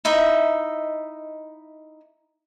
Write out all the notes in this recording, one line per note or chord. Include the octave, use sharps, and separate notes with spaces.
D#4 E4 D#5 E5